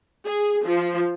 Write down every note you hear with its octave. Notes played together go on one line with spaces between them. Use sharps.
G#4
F3